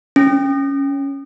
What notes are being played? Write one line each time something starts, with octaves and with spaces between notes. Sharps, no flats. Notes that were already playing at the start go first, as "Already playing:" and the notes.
C#4